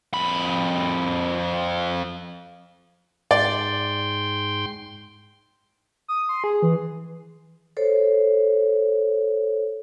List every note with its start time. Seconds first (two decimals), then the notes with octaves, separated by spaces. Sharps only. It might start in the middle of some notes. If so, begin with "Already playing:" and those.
0.13 F2 B5
3.31 G#2 D5 G5 C6
6.08 D#6
6.29 C6
6.44 G#4
6.62 E3
7.77 A4 C5 C#5